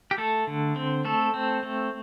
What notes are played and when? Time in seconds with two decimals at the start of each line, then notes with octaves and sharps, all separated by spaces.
0.11 G4
0.18 A3 A4
0.47 D3
0.76 C4
1.05 A3 A4
1.34 C4
1.63 A3